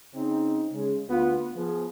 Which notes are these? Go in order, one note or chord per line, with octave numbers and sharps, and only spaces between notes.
C#3 C4 D#4
C#3 G#3
D2 B3 F4
F3 B3 G#4